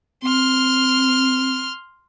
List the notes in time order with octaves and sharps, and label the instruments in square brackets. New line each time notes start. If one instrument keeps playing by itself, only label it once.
[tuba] C4 [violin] C6 F6